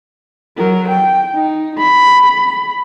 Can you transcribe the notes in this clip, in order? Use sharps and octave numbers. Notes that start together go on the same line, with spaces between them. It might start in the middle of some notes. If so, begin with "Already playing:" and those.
F#3 A#4
G5
D#4
B5